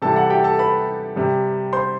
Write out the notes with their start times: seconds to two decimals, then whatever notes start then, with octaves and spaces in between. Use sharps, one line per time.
0.02 C3 E3 G3 A4 A5
0.16 F#5
0.30 G4 G5
0.44 A4 A5
0.59 B4 B5
1.16 C3 G3
1.73 C5 C6